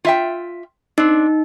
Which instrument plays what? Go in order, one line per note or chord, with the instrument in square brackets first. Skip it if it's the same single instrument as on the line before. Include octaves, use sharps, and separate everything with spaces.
[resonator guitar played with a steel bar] F4 E5 G5
[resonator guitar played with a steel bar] C4 D4 [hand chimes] D#4